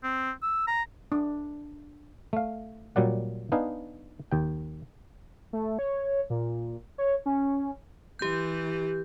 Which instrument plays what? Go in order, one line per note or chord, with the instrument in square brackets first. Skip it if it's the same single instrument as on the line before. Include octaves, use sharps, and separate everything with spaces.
[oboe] C4
E6
A#5
[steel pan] D4
[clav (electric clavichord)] A3 F5
A#2 F#3 G3 D5 F#5
B3 D4 D#4 F5 G#5
D#2 G5
[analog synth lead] A3
C#5
A#2
C#5
C#4
[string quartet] E3 [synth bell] G4 G6